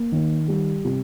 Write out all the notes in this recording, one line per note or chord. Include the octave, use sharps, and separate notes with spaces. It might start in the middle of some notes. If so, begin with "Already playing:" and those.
Already playing: A#3
D#3
G3
C3